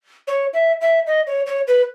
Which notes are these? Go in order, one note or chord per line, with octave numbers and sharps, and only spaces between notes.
C#5
E5
E5
D#5
C#5
C#5
B4